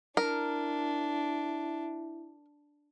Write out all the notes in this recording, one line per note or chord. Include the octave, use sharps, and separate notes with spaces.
D4 E4 A#4